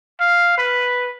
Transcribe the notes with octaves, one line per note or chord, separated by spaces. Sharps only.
F5
B4